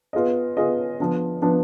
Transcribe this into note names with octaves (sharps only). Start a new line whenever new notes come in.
B3 F4 G#4 D#5
B3 F4 G#4 D#5
F3 B3 D4
F3 B3 D4